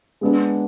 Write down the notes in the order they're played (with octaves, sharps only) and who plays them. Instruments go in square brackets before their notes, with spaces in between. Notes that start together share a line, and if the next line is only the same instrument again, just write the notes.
[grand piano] G#3 B3 D4